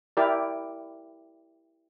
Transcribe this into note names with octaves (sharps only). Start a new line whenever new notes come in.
E4 G4 A#4 D5